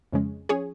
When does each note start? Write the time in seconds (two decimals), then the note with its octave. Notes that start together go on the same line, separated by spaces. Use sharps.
0.13 F2 C#3 G#3 C#4
0.49 F3 C#4 G#4 C#5